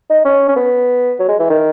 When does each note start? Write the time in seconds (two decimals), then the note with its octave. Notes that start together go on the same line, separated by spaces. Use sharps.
0.10 D#4
0.25 C#4
0.48 C#4
0.56 B3
1.19 F#3
1.28 G#3
1.39 E3
1.50 D#3